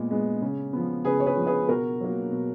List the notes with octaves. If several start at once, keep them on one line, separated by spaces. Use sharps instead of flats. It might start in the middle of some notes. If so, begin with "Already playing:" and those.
Already playing: A#2 G#3 B3
G#3 B3
C#3
F3 B3
C#3 G#4 B4
C#5
G#4 B4
F3 B3
G#4 B4
B2 F#4 A#4
F#3 A#3
B2